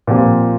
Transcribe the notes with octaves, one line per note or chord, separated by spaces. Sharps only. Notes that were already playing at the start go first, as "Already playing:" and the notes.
A#2 F3 C4 G4